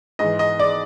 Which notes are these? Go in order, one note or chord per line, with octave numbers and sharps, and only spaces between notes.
G#2 E3 D#5
D#5
D5